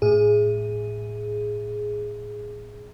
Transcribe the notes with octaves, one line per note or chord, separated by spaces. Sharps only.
A2 G#4